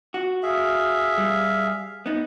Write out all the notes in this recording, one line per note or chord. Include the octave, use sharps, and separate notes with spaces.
F#4
G#4 E5 F5
G3
B3 D#4